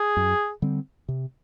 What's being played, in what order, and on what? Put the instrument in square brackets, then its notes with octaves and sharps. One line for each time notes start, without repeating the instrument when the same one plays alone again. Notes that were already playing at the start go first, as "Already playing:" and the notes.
Already playing: [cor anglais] G#4
[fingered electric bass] F#2
D3 G3 C4
C3